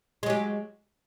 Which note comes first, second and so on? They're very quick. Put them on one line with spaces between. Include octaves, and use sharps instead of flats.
G#3 F#3 G4